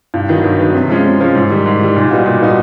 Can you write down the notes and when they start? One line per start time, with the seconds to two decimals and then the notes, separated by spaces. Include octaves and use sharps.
0.14 G2
0.29 D#3 F#3 B3
0.44 G2
0.59 D#3 F#3 B3
0.74 C3
0.89 F3 G#3 C#4
1.05 C3
1.20 F3 G#3 C#4
1.35 G#2
1.50 D#3 G3
1.66 G#2
1.81 D#3 G3
1.96 A#2
2.11 G3 B3 D#4 F#4
2.26 A#2
2.41 G3 B3 D#4 F#4